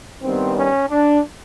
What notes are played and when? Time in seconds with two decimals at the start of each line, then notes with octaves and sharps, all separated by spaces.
0.22 G2 D#3 G3 B3 C4
0.56 C#4
0.89 D4